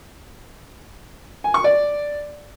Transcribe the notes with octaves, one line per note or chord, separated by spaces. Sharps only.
G#5
C#6
D5